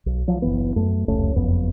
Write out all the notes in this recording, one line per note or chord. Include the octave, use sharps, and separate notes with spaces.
B1
F3 F#3
F#1 F#2 E3 B3
F#2 A3
F1 C#2 A3 C#4
F#1 F2 B3